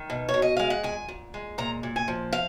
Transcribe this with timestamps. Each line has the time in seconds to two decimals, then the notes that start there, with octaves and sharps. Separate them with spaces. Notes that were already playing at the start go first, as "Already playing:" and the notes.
Already playing: D#3
0.10 B2
0.29 C#5
0.34 B2
0.42 D#5
0.57 G#3 F5
0.70 F#5
0.83 A#2 G#5
1.09 A#2
1.34 G#3
1.58 A#2 A#5
1.83 A#2
1.96 G#5
2.08 F3
2.33 F5